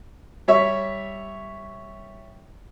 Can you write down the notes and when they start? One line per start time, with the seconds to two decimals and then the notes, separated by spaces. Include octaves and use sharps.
0.48 G3 C#5 E5